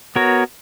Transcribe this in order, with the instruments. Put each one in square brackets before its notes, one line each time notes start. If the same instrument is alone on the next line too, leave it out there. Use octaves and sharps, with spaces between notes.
[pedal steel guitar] B3 F#4 A#4 C#5